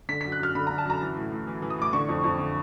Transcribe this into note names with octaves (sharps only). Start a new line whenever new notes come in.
D3 B6
B6
F#2
F#6
F#2 F6
D3 B5
A#5
D3
A5
F#2 A#5
E3
A2
A2
E3
E3
D#6
A2 D6
D3 C#6
F2
F2
D3